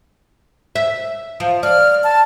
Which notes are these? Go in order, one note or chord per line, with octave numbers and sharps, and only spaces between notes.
E5
F3
D5 F6
A5